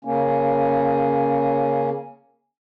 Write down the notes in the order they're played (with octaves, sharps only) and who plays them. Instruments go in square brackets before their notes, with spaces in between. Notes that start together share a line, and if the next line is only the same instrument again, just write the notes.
[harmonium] C#3 A#3 C#4